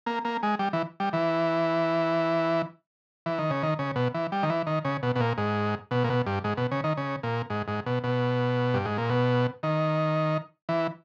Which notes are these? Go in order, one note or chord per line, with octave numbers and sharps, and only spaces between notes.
A#3
A#3
G#3
G3
E3
G3
E3
E3
D#3
C#3
D#3
C#3
B2
E3
G3
D#3
E3
D#3
C#3
B2
B2
A#2
G#2
B2
A#2
B2
G2
G#2
B2
C#3
D#3
C#3
A#2
G#2
G#2
B2
B2
G2
G#2
A#2
B2
D#3
E3